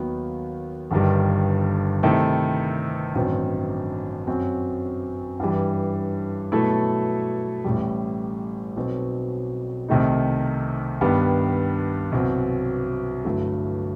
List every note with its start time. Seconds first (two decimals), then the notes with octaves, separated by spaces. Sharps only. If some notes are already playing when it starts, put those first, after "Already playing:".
Already playing: D#2 D#3 F#3 B3
0.91 G1 G2 D#3 G3
2.03 C3 D#3 A3 E4 A4
3.15 A1 G2 D#3 F#3 C4
4.27 F#2 F#3 C4 F#4
5.40 G2 E3 G3
6.52 B2 F#3 A3 E4 A4
7.64 A1 A2 G3
8.76 B1 B2 F#3 C4
9.88 C2 C3 D#3 A3 D#4
11.01 G2 D#3 G3 B3
12.12 C2 B2 F#3 C4 F#4
13.25 G1 G2 F#3 A3 E4